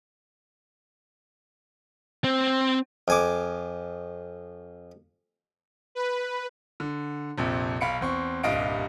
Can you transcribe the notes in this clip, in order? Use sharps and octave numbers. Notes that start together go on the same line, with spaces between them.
C4
F2 G#5 D6
B4
D3
A#1 F2 C3
B1 F5 B5 C#7 D7
E2 C4 C#6
D#1 C2 G2 D#5 F5 D7